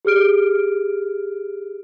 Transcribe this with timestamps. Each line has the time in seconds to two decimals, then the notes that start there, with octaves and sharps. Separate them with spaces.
0.05 G4 G#4 F6 D7